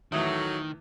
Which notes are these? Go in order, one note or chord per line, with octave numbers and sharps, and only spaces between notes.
E2 A2 D#3 F#3 A3 D#6